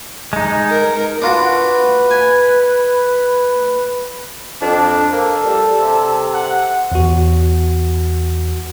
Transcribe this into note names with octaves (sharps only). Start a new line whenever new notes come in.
G#3 D#4
A#4
D4 F4 F#4 B4
G#5
F2 D4
A#3 A4
G3
C3
F#5
E2 F#4